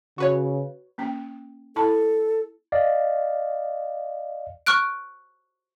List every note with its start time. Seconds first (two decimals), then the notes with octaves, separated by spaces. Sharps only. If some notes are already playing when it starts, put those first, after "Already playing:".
0.18 C#3 F#4 B4 C#5
0.98 A#3 C#4 G5
1.76 E4 A4 A5 B5
2.72 D5 D#5 F5
4.66 C#6 F6 F#6 D7